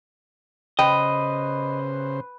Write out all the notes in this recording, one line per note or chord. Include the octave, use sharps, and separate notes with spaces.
C#3 B4 C5 D#5 G5